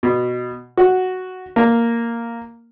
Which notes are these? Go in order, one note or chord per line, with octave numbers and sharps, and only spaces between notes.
B2
F#4
A#3